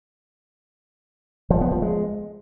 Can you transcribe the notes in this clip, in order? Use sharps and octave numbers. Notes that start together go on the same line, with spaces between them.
F3
B3
F3
G#3